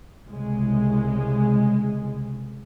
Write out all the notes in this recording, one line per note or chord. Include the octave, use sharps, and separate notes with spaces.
C2 C#3 G#3